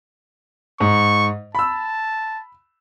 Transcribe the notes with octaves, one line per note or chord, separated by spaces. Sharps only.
G#2 C#6
A5 B5 E6